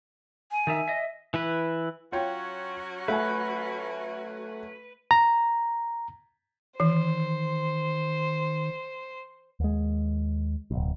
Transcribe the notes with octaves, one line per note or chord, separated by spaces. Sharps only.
G#5
D#3 D#4 E5
D#5 E5
E3 E4 B4
F#3 C#4 F4 F#4 C#5 G5
A3 B4 E5 F#5 G#5
A#5
D#3 E3 C5
D#2 G#3
D1 B1